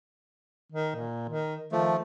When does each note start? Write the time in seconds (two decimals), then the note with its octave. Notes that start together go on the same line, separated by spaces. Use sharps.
0.72 D#3
0.96 A#2
1.30 D#3
1.72 D#3 F3 A3